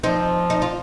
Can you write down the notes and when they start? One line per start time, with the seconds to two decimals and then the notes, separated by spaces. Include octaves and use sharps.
0.03 F3 C4 D#4
0.50 D#4
0.62 F4